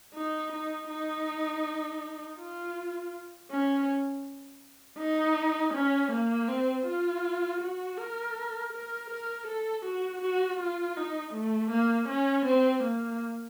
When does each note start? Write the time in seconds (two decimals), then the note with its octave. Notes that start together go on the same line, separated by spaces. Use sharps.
0.15 D#4
0.53 D#4
0.89 D#4
2.39 F4
3.51 C#4
4.99 D#4
5.74 C#4
6.12 A#3
6.48 C4
6.86 F4
7.61 F#4
7.98 A#4
8.73 A#4
9.10 A#4
9.47 A4
9.85 F#4
10.22 F#4
10.60 F4
10.96 D#4
11.34 A3
11.71 A#3
12.09 C#4
12.46 C4
12.83 A#3